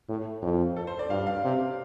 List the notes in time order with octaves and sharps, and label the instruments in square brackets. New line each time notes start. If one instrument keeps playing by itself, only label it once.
[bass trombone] A2
F2
[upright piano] A4
C5
D5
[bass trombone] G2 [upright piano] F5
[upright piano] F5
[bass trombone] C3